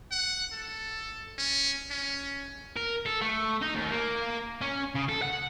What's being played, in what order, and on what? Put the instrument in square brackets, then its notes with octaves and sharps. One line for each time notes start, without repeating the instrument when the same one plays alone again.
[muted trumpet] F#5
A4
C#4
C#4
[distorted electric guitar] A#4
A4
A3
D#4
D#2
A#3
C#4
C#3
A4
F#5